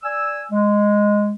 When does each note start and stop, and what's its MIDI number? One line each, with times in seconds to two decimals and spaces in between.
0.03 0.43 74
0.03 0.43 80
0.03 0.43 88
0.51 1.33 56